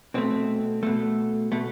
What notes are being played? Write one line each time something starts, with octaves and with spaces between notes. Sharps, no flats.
B2 A3 C4
B2 A3
B2 A3